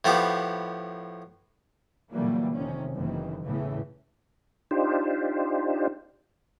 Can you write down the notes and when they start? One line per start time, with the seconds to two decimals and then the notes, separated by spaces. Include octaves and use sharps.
0.05 A2 F3 B3 G4
2.12 A#2 D3 E3 F#3 G3 A#3
2.56 F1 C3 D#3 C#4
2.95 F#1 F#2 D#3 E3
3.43 E2 A2 C#3 E3
4.71 D4 D#4 F4 G4 C5